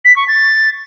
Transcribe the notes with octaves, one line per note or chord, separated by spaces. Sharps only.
B6
C#6
A6